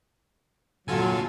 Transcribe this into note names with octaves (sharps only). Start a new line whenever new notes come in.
A#2 D3 F#3 F4 A4 G#5